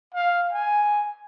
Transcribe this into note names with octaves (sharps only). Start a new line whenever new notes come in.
F5
G#5